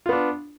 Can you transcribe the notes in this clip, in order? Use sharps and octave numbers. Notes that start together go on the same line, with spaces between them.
B3 D4 F4